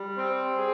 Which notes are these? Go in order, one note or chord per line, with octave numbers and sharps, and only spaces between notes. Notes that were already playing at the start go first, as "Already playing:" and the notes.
Already playing: G3
C4
G#4